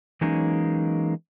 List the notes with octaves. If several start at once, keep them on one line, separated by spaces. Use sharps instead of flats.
E3 F#3 G#3 A#3 C#4 D#4